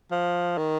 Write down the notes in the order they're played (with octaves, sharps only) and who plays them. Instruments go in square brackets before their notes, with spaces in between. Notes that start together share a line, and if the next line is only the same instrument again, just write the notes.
[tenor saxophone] F3
D#3